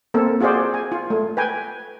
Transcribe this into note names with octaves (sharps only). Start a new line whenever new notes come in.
A#3 C4 A4
F4 F#4 G#4 C5 D5
G#5
F4
A3
B4 G5 G#5